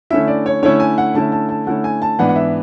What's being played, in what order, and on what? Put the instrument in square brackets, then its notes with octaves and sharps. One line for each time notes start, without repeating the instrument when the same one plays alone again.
[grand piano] D3 A3 C#4 E4 E5
D5
C#5
D3 A3 C#4 E4 C#5
G#5
F#5
D3 A3 C#4 E4 A5
A5
A5
D3 A3 C#4 E4 F#5
G#5
A5
G#2 E3 B3 D4 F#5
F#5
E5